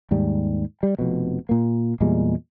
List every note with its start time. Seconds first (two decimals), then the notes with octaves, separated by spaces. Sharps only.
0.11 D#2 G#2 G3
0.83 G3
0.99 F1 F2 B2
1.49 A#2 A#3
2.00 E2 A#2 G3 G#3